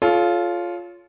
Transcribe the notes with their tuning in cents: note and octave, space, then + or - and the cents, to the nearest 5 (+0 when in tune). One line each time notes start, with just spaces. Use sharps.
F4 +0 A4 -35 C#5 +15